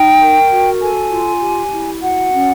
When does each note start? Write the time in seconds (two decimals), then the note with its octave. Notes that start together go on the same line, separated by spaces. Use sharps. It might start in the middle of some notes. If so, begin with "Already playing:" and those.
Already playing: D#4 G5
0.20 A#4
0.50 F#4
0.81 A4 G#5
1.11 F4
1.41 G4
1.72 E4
2.02 F#4 F#5
2.32 C#4